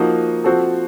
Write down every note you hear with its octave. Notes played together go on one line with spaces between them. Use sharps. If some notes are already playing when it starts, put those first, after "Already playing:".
Already playing: F3 A#3 D#4 F#4
F3 C4 F#4 A4